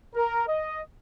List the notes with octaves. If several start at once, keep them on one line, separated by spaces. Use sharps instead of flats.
A#4
D#5